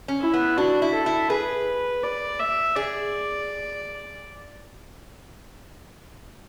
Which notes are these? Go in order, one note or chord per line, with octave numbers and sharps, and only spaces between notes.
C#4
E4
B3
D4 F#4
E4
A4
E4
G#4 B4
D5
E5
G#4 D5